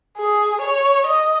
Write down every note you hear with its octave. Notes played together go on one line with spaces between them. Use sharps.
G#4
C#5
D#5